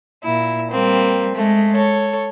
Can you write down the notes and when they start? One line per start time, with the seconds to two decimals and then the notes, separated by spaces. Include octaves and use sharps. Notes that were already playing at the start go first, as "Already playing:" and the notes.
0.23 A#2 E4
0.70 G3 A#3 C4
1.35 G#3 A3
1.75 A4 C#5